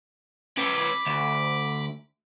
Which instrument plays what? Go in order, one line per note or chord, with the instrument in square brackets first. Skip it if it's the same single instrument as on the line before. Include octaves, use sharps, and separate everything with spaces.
[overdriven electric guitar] C#4 B4 [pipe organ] B5 D6
[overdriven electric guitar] D2